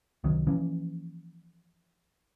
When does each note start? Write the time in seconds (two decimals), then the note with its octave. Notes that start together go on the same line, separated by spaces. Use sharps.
0.24 C2 D#3 F#3
0.47 E3 F3 A#3 C#4